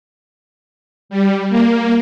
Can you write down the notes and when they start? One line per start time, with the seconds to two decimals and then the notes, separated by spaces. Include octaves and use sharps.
1.09 G3
1.49 A#3